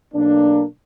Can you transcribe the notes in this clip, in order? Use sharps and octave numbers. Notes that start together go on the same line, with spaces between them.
B1 A#3 D4